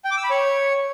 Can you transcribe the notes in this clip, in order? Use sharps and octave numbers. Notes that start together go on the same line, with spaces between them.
G5
D6
E6
B5
C#5